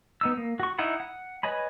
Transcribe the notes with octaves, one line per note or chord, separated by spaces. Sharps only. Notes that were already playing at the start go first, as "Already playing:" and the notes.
B3 D#4 E6
A#3
F#4 C#6
D#4 E4 F#5 B5
F#5
B4 C#5 D#5 G#5 B5